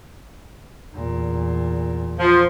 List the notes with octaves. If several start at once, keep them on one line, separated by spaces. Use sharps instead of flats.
E2 A#2
F3